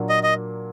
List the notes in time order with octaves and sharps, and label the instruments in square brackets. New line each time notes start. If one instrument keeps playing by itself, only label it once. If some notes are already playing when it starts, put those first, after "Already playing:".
Already playing: [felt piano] A#2 F#3 A#3 D4
[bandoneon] D#5
D#5